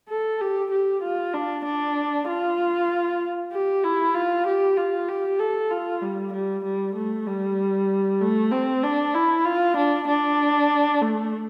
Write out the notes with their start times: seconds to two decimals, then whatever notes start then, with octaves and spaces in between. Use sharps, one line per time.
0.09 A4
0.41 G4
0.71 G4
1.02 F4
1.34 D4
1.65 D4
2.28 F4
3.52 G4
3.84 E4
4.14 F4
4.46 G4
4.77 F4
5.09 G4
5.40 A4
5.71 F4
6.02 G3
6.33 G3
6.64 G3
6.95 A3
7.27 G3
8.21 A3
8.51 C4
8.83 D4
9.14 E4
9.45 F4
9.77 D4
10.08 D4
11.02 A3